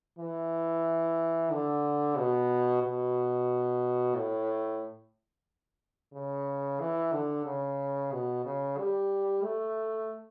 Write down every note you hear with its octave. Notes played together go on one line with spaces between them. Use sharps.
E3
D3
B2
B2
A2
C#3
E3
D3
C#3
B2
C#3
G3
A3